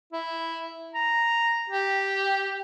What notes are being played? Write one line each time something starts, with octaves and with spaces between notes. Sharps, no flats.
E4
A#5
G4